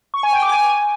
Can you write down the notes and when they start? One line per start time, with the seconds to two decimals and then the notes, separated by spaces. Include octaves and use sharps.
0.14 C#6
0.23 G#5
0.33 G5
0.42 D6
0.52 G#5